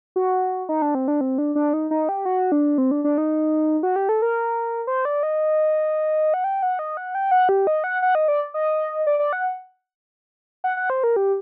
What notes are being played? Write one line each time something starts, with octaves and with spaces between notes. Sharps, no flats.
F#4
D#4
D4
C4
D4
C4
D4
D4
D#4
D#4
G4
F#4
D4
C4
D4
D4
D#4
F#4
G4
A4
A#4
C5
D5
D#5
F#5
G5
F#5
D#5
F#5
G5
F#5
G4
D#5
F#5
F#5
D#5
D5
D#5
D5
D5
F#5
F#5
F#5
C5
A#4
G4